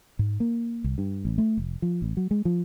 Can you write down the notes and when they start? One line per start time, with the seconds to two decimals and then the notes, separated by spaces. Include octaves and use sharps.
0.19 G#2
0.40 A#3
0.84 C2
0.98 G2
1.25 A1
1.38 A3
1.57 F1
1.82 F3
2.02 A1
2.17 F#3
2.31 G#3
2.45 F3